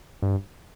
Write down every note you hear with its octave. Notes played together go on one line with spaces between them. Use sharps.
G2